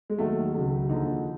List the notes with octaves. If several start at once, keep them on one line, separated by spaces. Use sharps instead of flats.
G#3
D#2 D#3 F#3 A3
C#2 C#3 F#3
D#2 D3 F3 D#4